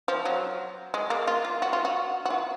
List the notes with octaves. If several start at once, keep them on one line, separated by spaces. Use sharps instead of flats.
F3
F#3
G#3
A#3
F4
F4
F#4
F4
F#4
F#4
F4